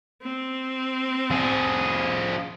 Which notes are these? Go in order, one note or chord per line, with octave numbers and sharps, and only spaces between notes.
C4
F3 G#4